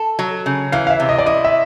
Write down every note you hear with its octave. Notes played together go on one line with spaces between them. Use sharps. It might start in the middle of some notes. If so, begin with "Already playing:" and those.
Already playing: A4
F#3
C#3
E3 F5
F5
E5
C3
D#5
D5
E4 D#5
E5